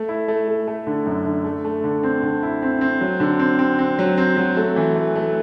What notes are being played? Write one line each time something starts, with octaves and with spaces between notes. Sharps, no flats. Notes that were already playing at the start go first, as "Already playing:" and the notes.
Already playing: A3
E4
A3
A3
A3
D3
F#2
D3
A3
A3
D3
C4
D3
E4
C4
C4
F#3
D3
C4
C4
C4
F#3
C4
F#3
A3
E3
A3
A3